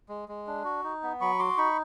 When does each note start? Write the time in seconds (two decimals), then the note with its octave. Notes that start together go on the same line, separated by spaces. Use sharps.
0.09 G#3
0.29 G#3
0.47 D4
0.65 F#4
0.84 D#4
1.03 B3
1.21 F#3 B5 C#6
1.39 F#4 C6 D6
1.57 D#4 B5 C#6